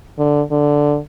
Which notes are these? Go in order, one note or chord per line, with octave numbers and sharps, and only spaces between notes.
D3
D3